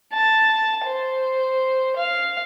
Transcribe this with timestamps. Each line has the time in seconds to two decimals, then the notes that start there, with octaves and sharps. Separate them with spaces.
0.13 A5
0.86 C5
1.96 F5